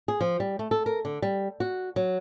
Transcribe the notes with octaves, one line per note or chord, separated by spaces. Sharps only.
G#4
F3
G3
A3
A4
A#4
D3
G3
F#4
F#3